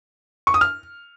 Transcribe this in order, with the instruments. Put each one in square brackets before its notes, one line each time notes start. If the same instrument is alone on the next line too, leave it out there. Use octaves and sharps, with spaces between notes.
[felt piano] C#6
D#6
F6